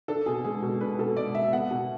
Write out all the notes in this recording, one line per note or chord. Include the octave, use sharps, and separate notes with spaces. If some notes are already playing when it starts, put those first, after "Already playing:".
D4 A4
B2 G#4
G#3 G#4
B2
D4 B4
B2 A4
G#3 D5
B2 E5
B3 F#5
B2